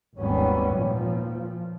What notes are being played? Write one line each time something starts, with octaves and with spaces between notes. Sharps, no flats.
G#1 D#2 G3 B3 C#4
A#2 F3